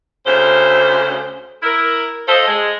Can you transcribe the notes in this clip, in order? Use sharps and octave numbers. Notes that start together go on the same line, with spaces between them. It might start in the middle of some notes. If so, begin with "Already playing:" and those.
D2 C#3 C5
E4 A#4
F4 A4 C5 D#5
G#3